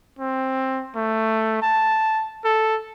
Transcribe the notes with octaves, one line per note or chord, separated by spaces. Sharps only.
C4
A3
A5
A4